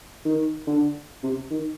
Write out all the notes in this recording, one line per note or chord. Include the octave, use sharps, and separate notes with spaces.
D#3
D3
C3
D#3